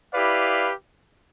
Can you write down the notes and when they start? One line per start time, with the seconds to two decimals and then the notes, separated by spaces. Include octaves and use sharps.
0.12 E4 G4 B4 D5 F5